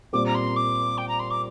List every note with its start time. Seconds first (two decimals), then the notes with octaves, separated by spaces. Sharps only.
0.13 A#2 G3 C4 D6
0.26 A#5
0.34 C6
0.56 D6
0.97 G5
1.08 A#5
1.19 C6
1.30 D6